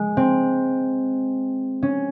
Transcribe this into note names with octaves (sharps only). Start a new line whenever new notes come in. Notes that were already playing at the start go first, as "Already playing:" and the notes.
Already playing: G#3
C4
C#4